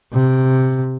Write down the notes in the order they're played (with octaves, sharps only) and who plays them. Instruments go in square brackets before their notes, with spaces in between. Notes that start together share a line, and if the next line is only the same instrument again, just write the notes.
[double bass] C3